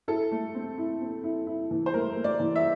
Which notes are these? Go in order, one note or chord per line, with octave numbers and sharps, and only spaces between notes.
E4 A4
A3
C4
E4
C4
E4
E4
E3
C5
A3 A#4
A3
D5
E3
E5